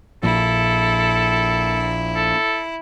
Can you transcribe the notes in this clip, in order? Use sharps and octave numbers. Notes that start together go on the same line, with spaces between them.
A#1 A#2 F3 E4 A4
A4